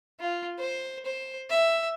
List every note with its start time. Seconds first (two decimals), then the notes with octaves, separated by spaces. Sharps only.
0.20 F4
0.59 C5
1.06 C5
1.50 E5